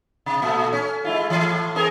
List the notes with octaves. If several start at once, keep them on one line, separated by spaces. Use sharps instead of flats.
C3
A#2 A3
C#4
G#3 E4 F4
A2 E3
C4 G#4 A#4